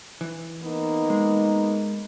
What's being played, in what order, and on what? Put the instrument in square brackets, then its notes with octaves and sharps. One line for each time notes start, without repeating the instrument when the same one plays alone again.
[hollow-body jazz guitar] E3
[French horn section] A#3 B3 D#4
[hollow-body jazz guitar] G#3